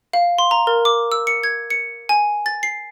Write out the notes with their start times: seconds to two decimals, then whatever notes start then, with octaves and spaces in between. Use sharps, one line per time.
0.13 F5
0.38 C6
0.51 A#5
0.67 A#4
0.85 D6
1.12 E6
1.27 C#7
1.44 G#6
1.70 C#7
2.09 G#5
2.46 A6
2.63 C7